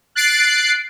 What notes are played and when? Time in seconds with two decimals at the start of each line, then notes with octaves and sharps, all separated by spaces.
0.15 F#6 A6 C7 D7